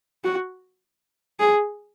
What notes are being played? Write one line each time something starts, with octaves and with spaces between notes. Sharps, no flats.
F#4
G#4